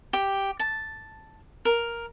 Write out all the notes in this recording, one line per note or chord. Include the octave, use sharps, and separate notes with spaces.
G4
A5
A#4